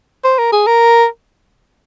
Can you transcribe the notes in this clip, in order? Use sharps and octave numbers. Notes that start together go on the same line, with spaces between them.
C5
A#4
G#4
A#4